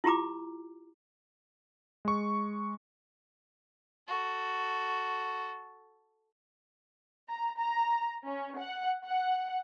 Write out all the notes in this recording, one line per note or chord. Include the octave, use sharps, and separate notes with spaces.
E4 F4 G4 A#5 D6
G#3 C#6
F#4 A4
A#5
A#5
C#4
F#5
F#5